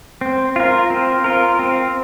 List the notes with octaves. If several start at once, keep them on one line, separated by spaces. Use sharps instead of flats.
C4
F4 A#4
C4
F4 A#4
C4